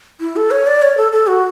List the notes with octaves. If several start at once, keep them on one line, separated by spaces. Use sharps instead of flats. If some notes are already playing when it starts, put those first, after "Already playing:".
E4
A4
C#5
D5
C#5
A4
A4
F#4